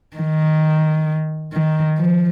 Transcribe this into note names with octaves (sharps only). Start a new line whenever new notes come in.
D#3
D#3
F3